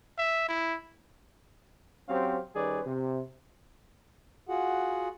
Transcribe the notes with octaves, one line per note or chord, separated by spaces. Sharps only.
E5
E4
F#3 C4 C#4 G4 C5 F5
D#3 G3 C#4 G#4 B4 D5
C3
F4 F#4 G#4 F#5